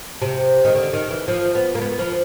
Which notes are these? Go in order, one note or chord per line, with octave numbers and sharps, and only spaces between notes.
C3
D#3
D3
D#3
E3
F3
B3
A#3
B3
F3